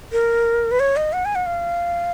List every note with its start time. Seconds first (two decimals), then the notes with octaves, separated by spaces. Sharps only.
0.12 A#4
0.71 B4
0.80 C#5
0.96 D#5
1.13 F#5
1.25 G#5
1.35 F#5
1.46 F5